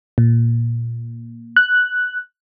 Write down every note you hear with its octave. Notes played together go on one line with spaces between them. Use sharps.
A#2
F#6